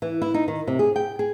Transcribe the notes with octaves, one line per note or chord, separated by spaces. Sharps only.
E3
E4
D#4
D#3
C3
G#4
G5
G#4